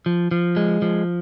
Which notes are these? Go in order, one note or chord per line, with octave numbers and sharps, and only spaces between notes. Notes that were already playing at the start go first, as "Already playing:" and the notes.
F3
F3
G#3
F3